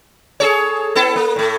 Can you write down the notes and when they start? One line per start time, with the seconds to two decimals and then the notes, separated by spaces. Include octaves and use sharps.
0.40 G#4 A4 C#5
0.95 B3 E4 A4
1.16 A#3
1.36 A2 A3